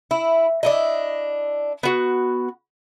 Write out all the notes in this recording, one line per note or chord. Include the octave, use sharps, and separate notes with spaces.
E4
D4 E4 D#5
B3 F#4